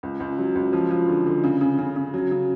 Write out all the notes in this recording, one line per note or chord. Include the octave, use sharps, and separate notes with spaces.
C#2
C#2
F#3
C#2
F3
F3
D3
D3
C#3
C#3
C#3
C#3
F#3
C#3